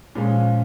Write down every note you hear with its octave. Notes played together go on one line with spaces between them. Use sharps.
A#2 F3 G#3 C#4